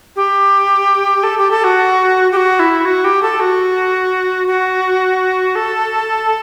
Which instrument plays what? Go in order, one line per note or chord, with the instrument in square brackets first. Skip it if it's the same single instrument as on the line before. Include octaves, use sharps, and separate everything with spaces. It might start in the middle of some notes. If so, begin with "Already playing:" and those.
[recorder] G4
A4
G4
A4
F#4
G4
F#4
E4
F#4
G4
A4
F#4
F#4
A4